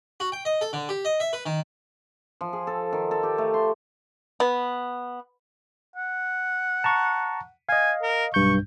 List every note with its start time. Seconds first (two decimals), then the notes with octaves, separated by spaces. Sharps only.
0.20 F#4
0.32 G5
0.45 D#5
0.61 A4
0.73 D3
0.89 G4
1.05 D#5
1.20 E5
1.33 B4
1.46 D#3
2.41 F3
2.53 G#4
2.67 A4
2.93 D#3
3.11 A4
3.23 G4
3.38 A3
3.54 C6
4.40 B3
5.96 F#5
6.84 A5 A#5 C#6
7.69 D#5 F5 G#5
8.03 A#4
8.34 B1 G2 C#6 G6